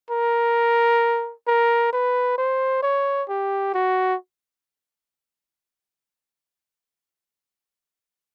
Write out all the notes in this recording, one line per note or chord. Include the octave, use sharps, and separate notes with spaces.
A#4
A#4
B4
C5
C#5
G4
F#4